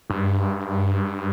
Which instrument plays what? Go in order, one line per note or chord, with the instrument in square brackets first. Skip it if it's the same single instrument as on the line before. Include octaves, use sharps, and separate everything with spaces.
[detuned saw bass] G2